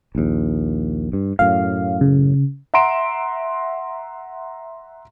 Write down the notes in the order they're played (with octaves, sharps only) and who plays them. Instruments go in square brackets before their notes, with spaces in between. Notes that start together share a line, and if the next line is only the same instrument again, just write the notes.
[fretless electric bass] A#1 D#2
G2
[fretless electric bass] F#2 A2 [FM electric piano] F5
[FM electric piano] C#3
[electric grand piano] E5 F#5 A#5 C6 D7 E7